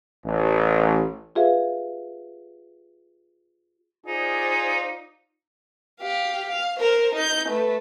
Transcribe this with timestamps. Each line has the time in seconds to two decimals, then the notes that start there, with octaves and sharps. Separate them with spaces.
0.25 A1
1.36 F4 G4 G#4 B4 E5 F5
4.06 D#4 F4 G#4 C5 D5
6.01 G4 F5
6.50 F5
6.80 A#4 C5
7.15 D#4 G6
7.49 A3 B4